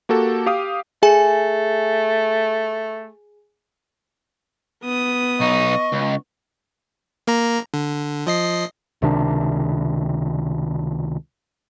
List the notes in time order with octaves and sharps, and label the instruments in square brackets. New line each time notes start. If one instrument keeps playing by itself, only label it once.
[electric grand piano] A#3 F#4 G4 A4
G4 F5 D6 D#6
[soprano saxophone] A3 [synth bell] G#4 G#5
[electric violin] B3 D#6
[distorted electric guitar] B1 D#4 [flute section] D#5 C#6
[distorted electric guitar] C#2
[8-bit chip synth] A#3 A#5
D3
F3 D#5 C7
[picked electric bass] C#2 C3 D#3 D4